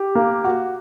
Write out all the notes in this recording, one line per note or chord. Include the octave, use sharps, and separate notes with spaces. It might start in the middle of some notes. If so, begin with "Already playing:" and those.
Already playing: G4
A#3
F#4